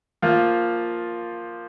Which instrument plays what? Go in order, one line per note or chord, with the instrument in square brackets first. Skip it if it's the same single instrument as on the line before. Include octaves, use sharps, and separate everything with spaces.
[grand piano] F3 A#3 F4